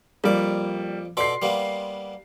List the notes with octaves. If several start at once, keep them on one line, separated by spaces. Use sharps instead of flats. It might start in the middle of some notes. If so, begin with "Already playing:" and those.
F2 G3 A#3 D5
B2 A4 D5 C6 C7
G3 A#3 B3